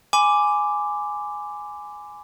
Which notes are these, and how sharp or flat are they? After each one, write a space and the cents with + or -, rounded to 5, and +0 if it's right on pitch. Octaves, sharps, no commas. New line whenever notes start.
G#5 +0 B5 +40 D6 +0